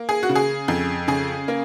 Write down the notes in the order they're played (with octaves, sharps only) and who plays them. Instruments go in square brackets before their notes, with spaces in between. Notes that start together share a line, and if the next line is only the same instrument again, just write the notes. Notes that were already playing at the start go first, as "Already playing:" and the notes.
Already playing: [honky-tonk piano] A#3
G#4
F#4
C#3
G#4
F2
C#3 G#4
A#3